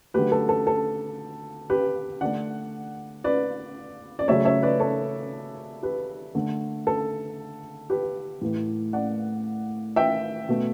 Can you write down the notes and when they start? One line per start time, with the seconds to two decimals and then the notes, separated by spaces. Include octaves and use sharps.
0.14 D3 F#3 A3 G4 B4
0.32 A4
0.49 A4
0.67 A4
1.70 G4 B4
2.21 D3 A3 D5 F#5
3.24 B4 D5
4.19 D5
4.28 C#3 F#3 A3 C#5 E5
4.45 C#5 E5
4.63 B4 D5
4.80 A4 C#5
5.83 G4 B4
6.35 D3 A3
6.87 A4
7.90 G4 B4
8.41 A2 E3 A3
8.93 D5 F#5
9.96 E5 G5
10.49 B2 A3